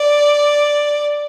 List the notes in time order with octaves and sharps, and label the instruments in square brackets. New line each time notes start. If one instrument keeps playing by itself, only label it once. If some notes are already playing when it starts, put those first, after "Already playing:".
Already playing: [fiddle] D5